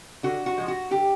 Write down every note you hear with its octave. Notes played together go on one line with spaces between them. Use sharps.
D3 F#4
F#4
F3 G#3
F#4
D3 G4